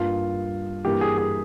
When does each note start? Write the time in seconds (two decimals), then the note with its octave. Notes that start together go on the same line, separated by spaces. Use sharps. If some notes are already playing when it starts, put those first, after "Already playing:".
Already playing: G2 G3 A#3 F4
0.85 G2 E3 A#3 G4
1.01 G#4
1.18 G#4